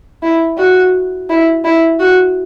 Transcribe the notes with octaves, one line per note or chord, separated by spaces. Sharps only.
E4
F#4
E4
E4
F#4